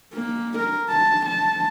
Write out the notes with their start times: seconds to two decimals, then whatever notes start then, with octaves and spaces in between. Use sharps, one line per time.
0.14 A#3
0.58 A#4
0.90 A5
1.25 A5